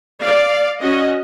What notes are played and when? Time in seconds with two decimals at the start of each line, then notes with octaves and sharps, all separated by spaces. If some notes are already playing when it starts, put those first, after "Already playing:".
0.22 D5 F5
0.80 C#4 F#4 D#5